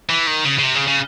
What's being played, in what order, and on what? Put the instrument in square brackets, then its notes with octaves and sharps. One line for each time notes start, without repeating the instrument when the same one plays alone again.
[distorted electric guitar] E3
D#3
C#3
C#3
C3
C#3
C#3